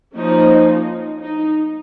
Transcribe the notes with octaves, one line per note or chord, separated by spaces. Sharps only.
F3 A#3 C#4 D#4
D#4